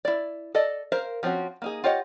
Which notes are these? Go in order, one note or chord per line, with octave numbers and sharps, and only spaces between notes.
E4 D5
A4 D5 D#5
A#4 C5 F5
F3 C4 C#4 F#4
A#3 D#4 G#4
F4 G4 C#5 D#5 F#5